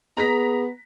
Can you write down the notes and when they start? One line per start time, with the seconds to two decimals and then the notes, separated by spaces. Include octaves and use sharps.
0.17 B3 G#4 A#5 A#6 B6